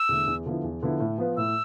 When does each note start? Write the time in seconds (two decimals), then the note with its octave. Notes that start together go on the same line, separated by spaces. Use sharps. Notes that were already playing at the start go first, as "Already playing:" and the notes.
Already playing: E6
0.09 E2 D3 A3
0.27 E2
0.46 D3 F3 B3 E4
0.64 E2
0.83 D3 F3 B3 E4
1.00 A2
1.18 F3 B3 F4 B4
1.37 A2 E6